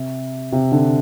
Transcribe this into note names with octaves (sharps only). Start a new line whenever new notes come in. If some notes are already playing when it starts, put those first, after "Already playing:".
Already playing: C3
C3
D3